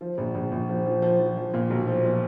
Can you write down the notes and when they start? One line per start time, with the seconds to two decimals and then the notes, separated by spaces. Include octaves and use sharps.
0.01 F3
0.18 A#1
0.35 A#1
0.52 A#1
0.69 F3
0.86 F3
1.02 F3
1.19 F3
1.37 F3
1.54 A#2
1.70 B1
1.87 F3
2.04 A#2